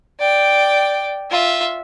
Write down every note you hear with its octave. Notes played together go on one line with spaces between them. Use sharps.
D5 G5
F4 E5